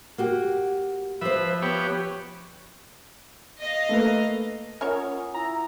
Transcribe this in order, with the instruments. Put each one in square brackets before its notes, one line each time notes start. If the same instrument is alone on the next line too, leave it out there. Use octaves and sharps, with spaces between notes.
[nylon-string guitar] A#3 F#4 G4
[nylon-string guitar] F3 C5 [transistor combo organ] B4 E5
[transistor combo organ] B3 G4 C#5
[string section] D#5 F5
[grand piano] A3 A#3 B4
[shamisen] C#4 A#4 C#5 [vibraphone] F4 G#5 D#6 [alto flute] F#5
[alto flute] E4 [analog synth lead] A#5